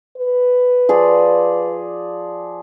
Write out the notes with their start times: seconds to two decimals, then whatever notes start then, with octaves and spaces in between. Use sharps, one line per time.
0.17 B4
0.89 F3 G#4 D5